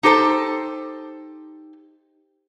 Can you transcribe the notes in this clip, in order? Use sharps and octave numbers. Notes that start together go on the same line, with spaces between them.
D#4 G4 A4 C5 A5